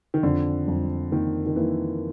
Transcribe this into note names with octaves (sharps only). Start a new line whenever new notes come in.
D#3
F2 D3
F2
D#3 A#3
D#3
E3 A#3